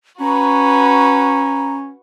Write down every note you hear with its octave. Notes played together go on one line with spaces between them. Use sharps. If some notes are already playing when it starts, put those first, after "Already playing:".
C#4 F#4 B4 A#5